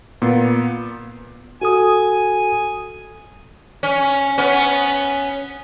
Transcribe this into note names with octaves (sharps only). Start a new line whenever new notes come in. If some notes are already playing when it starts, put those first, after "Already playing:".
A#2 B3
F#4 A4 G#5 D#6
C#4
B3 C#4